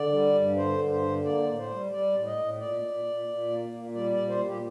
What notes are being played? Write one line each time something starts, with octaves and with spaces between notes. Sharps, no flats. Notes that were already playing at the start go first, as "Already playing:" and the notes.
Already playing: D3 D5
G3
G2
D3 C5
G2
C5
D3
A#3 D5
A2
C5
G3
G3 D5
A2
D#5
A2
A#2 D5
A#2
A#2
A#2
A#3
A#2
G3 D5
D5
A#2
C5
A#2
G4